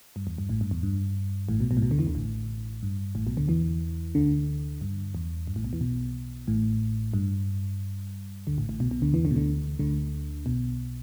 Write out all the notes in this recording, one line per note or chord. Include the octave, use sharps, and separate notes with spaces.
G2
E2
G2
A1 A2
G2
E2
G2
A1 A2
B1 B2
B1 B2
A2
B1 B2
D2 D3
E2 E3
D2 D3
A1 A2
G2
A1 A2
B1 B2
D2 D3
E2 E3
D2 D3
G2
E2
G2
A1 A2
B1 B2
E2 E3
B1 B2
A1 A2
G2
D2 D3
A1 A2
A1 A2
B1 B2
B1 B2
D2 D3
E2 E3
D2 D3
B2
D2 D3
D2 D3
B1 B2